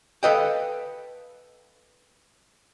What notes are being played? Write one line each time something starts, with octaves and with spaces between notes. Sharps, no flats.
A4 B4 D#5 F5 G5